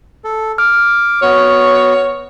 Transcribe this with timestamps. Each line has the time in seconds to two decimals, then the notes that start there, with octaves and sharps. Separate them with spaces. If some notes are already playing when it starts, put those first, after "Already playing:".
0.24 A4
0.58 D6 F6
1.22 B3 F#4 C#5